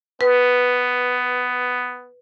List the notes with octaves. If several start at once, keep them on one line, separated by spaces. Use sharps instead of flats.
B3 B4